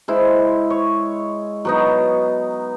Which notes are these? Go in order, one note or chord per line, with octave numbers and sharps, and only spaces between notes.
G#3 E4 C5
C#5
F#3 B3 D#4